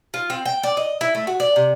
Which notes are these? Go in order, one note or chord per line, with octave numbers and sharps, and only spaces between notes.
F4
C4
G5
D5
D#5
E4
A3
F#4
D5
C3